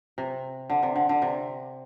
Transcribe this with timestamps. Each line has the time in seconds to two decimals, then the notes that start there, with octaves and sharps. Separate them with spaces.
0.18 C3
0.70 D3
0.83 C3
0.96 D3
1.09 D3
1.22 C3